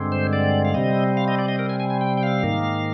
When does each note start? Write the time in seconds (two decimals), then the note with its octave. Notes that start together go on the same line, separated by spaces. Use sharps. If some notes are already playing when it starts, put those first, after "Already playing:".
Already playing: G2 D3 G#3 C4
0.12 C5
0.33 D5
0.65 F5
0.74 C3 G3 C4 D#5
1.17 F5
1.28 D#5
1.39 D5
1.49 D#5
1.59 A#4
1.69 G#5
1.80 G#5
1.90 G#5
2.01 G5
2.17 G5
2.23 F5
2.43 G#2 D#3 A#3